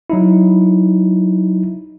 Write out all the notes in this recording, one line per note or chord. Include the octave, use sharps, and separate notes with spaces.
F#3 D#4 E4